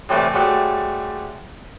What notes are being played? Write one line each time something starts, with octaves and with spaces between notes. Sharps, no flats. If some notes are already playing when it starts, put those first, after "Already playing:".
A2 C3 E3 G3 A3
G#2 F#3 G3 A3